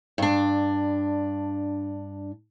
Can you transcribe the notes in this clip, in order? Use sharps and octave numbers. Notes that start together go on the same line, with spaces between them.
G2 D4